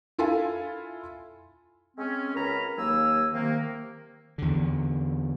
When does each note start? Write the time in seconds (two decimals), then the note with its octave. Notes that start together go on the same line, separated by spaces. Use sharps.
0.19 E4 F4 A4 F5 G#5
1.97 G#3 C4 C#4
2.35 C#2 A#4 A#5 B5
2.77 D#2 F#3 A#3 G#5 E6
3.33 C3 D#3 A#3
4.38 E2 D3